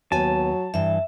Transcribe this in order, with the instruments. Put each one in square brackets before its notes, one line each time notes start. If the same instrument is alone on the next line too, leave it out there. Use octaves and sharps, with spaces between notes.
[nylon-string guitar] D#2 B3 G#5 [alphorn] F#3 [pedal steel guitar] A5
[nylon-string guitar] G2 E3 [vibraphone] E5